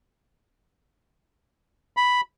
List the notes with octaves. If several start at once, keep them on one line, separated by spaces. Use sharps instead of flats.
B5